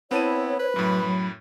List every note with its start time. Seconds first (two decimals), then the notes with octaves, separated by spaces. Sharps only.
0.11 B3 C4 E4 C#5 A5 D#7
0.59 B4 C5
0.76 F#2 A2 F#3 B5
1.05 F#3